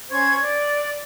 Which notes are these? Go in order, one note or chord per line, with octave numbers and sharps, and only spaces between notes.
C#4 C5 C#6 G#6
D5